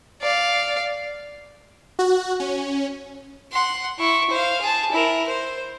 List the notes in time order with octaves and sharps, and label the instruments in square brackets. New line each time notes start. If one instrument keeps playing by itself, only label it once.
[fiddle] D5 F5
[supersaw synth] F#4
C#4
[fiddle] F#5 C6
E4 C#6
C5 F5
G#4 A5
E4 A#4
C5